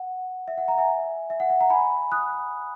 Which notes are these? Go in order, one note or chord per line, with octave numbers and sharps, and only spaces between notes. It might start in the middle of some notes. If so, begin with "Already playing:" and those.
Already playing: F#5
E5
F#5
F#5 A#5
E5 G#5
E5
F#5
F#5
F#5 A#5
G#5 B5
D#6 F#6